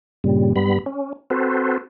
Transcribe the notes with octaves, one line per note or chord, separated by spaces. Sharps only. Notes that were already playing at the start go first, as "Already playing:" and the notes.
G2 A#2 C#3 G3
G2 G3 B3 B5
C#4
C4 F#4 A4 B4 C5